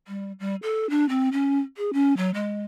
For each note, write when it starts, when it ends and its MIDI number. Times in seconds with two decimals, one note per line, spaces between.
0.08 0.32 55
0.40 0.55 55
0.63 0.89 69
0.90 1.08 62
1.09 1.29 60
1.32 1.59 61
1.77 1.93 68
1.93 2.16 61
2.17 2.30 54
2.34 2.65 56